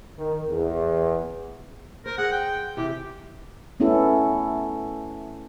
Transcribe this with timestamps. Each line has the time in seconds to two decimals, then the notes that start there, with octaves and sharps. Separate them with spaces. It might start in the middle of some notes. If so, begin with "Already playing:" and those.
0.17 D#3
0.50 E2
2.06 A#4 C5
2.18 G#4 F#5
2.32 G5
2.77 C3 E3 G4
3.80 A3 B3 C#4 E4 A4